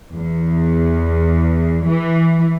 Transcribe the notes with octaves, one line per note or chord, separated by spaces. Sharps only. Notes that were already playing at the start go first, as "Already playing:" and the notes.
E2
E3